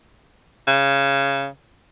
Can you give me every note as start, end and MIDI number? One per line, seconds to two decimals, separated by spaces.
0.67 1.46 49